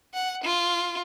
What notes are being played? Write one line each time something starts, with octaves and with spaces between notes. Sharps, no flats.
F#5
F4